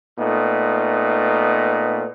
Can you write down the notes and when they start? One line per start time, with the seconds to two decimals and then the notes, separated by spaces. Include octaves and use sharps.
0.19 A#2 A3 B3 D#4